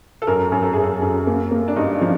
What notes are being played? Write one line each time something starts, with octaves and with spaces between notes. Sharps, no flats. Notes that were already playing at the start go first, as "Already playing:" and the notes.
A4
F#2 A#4
F#2 A#4
A4
F#2 G#4
A4
F#2
A#3
A#3
D4
G2 D#4
F3